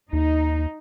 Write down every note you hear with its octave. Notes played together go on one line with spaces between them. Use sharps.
D#2 D#4